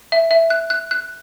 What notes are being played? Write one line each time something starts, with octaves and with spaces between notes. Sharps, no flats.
E5
E5
F#6
F#6
F#6